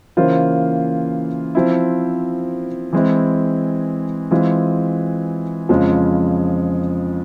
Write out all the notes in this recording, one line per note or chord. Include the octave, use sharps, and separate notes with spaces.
C#3 E3 A#3 F4 C5
F3 C4 E4
E3 G#3 C4 E4
E3 G#3 C4 F4
F2 C#3 F3 G#3